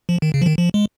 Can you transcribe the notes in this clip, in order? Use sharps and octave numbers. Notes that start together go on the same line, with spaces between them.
F3
D#3
C#3
F3
D#3
F3
G#3